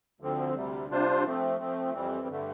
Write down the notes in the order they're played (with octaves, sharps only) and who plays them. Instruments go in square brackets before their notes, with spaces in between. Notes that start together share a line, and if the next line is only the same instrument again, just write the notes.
[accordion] D2 D3 F3 C4
D2 C3 G3
C3 G3 D4 F4 C5
F3 A3 C4
F3 A3 C4
F2 E3 G3 C4
G2 D3 A3